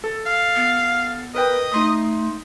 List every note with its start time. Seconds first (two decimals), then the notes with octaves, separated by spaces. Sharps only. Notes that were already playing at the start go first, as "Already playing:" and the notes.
0.04 A4
0.26 F5
0.55 B3
1.35 A#4 B4 D#5 G5
1.72 A3 D#4 C6 D#6